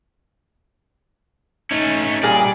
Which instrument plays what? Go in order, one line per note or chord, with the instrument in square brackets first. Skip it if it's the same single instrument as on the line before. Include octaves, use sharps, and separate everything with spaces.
[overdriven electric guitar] A3 C#4 [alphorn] D#4
[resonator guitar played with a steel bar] A#2 G#4 [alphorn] G3 [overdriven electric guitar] D5